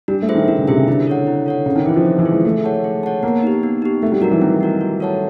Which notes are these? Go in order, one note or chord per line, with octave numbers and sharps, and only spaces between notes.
G3 D4
A3
F4 G#4 C5 E5
D#3
D#3 D4
C#3
C3 F4 G#4 C5 E5
C#3
D3 E4
A4 C#5 F#5
E4
A4 C#5 F#5
C#3 C4
D#3
E3 F4 G#4
F3
C4
E3
F4 G#4
G#3
A3 G#4
C#5 F#5 A5
G#4
C#5 F#5 A5
A#3 B3
D#4 G4
B3
D#4 G4
A3 C4
G3
F#3 D#4 F#4 A#4
E3
D#3 C4
D#4 F#4 A#4
F#4
A4 C#5 F#5 A5